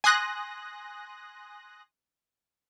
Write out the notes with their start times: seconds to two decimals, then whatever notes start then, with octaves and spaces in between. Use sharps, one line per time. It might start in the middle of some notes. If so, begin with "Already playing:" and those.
0.04 G#5 C6 D#6 F#6 A#6